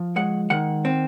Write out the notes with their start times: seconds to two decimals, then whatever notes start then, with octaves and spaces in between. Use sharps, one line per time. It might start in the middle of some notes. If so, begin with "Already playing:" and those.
Already playing: F3
0.16 G#3 F#5
0.50 D#3 F#5
0.85 C4